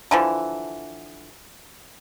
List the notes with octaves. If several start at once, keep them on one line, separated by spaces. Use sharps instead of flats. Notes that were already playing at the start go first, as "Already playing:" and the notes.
D3 E3 F3